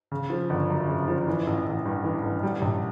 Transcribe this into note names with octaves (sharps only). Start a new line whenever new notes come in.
C#3
F3
G1
F#2
C#3
F3
E3
A1
A1
G2
E3
A1
G3
A#1